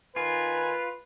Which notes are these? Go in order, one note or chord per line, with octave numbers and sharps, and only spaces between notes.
D#3 F4 B4 G#5